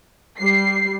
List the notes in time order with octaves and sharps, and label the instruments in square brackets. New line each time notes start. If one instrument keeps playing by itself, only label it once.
[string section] G3 C7